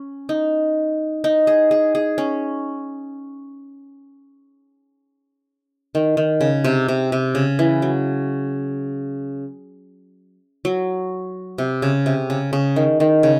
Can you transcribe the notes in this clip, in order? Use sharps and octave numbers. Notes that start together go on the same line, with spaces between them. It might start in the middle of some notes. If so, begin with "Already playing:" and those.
Already playing: C#4
D#4
D#4
G#4
G#4
G#4
C#4
D#3
D#3
C#3
C3
C3
C3
C#3
E3
F#3
F#3
C3
C#3
C3
C#3
C#3
D#3
D#3
C#3